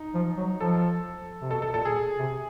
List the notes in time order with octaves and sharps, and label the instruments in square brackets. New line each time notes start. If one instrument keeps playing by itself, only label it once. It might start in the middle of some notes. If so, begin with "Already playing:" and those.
Already playing: [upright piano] D#4
[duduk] F3
F#3
[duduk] F3 [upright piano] A4
[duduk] C3
[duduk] B2 [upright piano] A4
[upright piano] A4
[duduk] A#2 [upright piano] A4
[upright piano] G#4
[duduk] C3